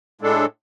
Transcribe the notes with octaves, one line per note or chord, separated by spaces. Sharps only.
A2 G#3 D4 A4